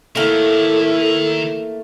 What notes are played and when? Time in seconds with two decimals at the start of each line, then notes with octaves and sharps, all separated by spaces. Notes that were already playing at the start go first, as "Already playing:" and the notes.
0.15 D#3 A3 A#3 E4 A4